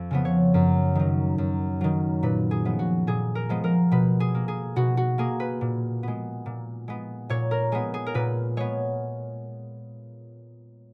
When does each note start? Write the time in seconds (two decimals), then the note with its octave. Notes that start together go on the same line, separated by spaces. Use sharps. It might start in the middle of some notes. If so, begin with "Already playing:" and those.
Already playing: F2
0.11 C#3 F3 B3
0.25 C#5
0.54 F#2
0.95 D#3 F#3
1.38 F#2
1.81 D#3 F#3
2.23 A#2 B4
2.51 G#4
2.65 F3 G#3 B3
2.79 F#4
3.07 A#2 G#4
3.35 A#4
3.49 F3 G#3 B3
3.64 A#4
3.91 B2 B4
4.20 G#4
4.35 A#3
4.48 G#4
4.76 B2 F#4
4.97 F#4
5.18 A#3 G#4
5.40 B4
5.61 A#2
6.03 G#3 B3
6.46 A#2
6.88 G#3 B3
7.29 A#2 C#5
7.51 A#4
7.72 G#3 B3 G#4
7.94 G#4
8.06 A#4
8.14 A#2 B4
8.57 G#3 B3 C#5